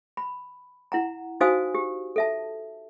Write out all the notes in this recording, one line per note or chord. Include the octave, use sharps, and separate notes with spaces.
B5
E4 F#5 A#5
D#4 F#4 C5 F5 G#5 D#6
G4
A4 E5 A5